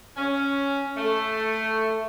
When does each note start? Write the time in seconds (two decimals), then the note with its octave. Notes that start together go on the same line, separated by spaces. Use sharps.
0.17 C#4
0.97 A3